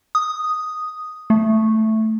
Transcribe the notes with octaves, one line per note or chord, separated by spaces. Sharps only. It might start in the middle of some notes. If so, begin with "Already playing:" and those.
D#6
A3